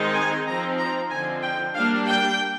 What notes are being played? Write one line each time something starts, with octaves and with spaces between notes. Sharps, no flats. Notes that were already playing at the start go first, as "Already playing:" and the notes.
Already playing: D#3 G#3 C4 D#4
G#5
F3 C4 D#4 A#5
A#5
D3 F3 C4 D#4 G#5
G5
G3 A#3 D4 F5
G5